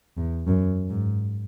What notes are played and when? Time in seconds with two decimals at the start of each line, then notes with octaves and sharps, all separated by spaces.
0.17 E2
0.47 F#2
0.90 G#2